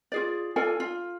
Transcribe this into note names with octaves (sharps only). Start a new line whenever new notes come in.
F4 G#4 D5
F4 A4 D5 G#5
F4